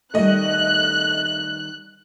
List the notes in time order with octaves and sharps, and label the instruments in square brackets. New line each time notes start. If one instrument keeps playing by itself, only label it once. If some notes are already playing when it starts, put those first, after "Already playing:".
[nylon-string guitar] D#3 G3 [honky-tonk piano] A3 D#5 [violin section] F#6